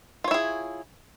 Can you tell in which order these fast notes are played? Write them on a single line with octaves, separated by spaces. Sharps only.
F4 C#5 E4 G#4